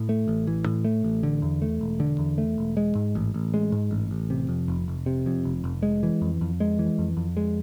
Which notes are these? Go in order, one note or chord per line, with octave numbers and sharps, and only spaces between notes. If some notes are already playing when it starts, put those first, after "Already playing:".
Already playing: A2
A3
A1
E3
A2
A3
A1
D3
E2
A3
E1
D3
E2
A3
E1
G#3
G#2
A1
A1
G#3
G#2
A1
A1
C3
F2
F1
F1
C3
F2
F1
F1
G#3
E3
F2
F2
G#3
E3
F2
F2
G#3